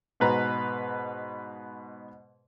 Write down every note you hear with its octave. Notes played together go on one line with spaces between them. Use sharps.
G#2 B2 B4 A#5